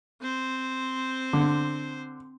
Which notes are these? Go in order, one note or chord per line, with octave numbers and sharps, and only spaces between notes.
C4 C5
D3